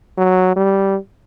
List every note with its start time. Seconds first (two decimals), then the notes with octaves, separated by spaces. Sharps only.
0.18 F#3
0.56 G3